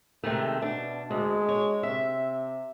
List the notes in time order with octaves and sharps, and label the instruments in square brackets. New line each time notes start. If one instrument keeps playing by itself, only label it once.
[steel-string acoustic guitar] C3 D#3 A3 [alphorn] G#3
[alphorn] B2 [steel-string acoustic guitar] D4
[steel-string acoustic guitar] D2 [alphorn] G#3
[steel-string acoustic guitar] C#5
[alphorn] C3 [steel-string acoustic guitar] E5